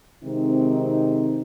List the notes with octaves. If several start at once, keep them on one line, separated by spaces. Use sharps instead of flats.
C3 D#3 G#3 C4 D#4